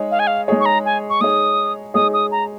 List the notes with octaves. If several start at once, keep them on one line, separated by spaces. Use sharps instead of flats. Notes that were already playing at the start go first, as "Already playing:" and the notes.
Already playing: G#3 D#4 G#4 C#5
F5
G#5
F5
G#3 D#4 G#4 C#5
C#6
A#5
G#5
C#6
G#3 D#4 G#4 C#5 D#6
G#3 D#4 G#4 C#5 D#6
D#6
A#5